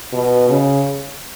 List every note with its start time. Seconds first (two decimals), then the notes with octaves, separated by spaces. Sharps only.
0.13 B2
0.49 C#3